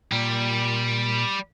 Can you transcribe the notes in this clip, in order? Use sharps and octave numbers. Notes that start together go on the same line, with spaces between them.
A#2 G3